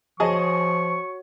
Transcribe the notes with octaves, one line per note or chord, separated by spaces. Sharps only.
F3 F#4 G#4 C#5 D#5 A5 C#6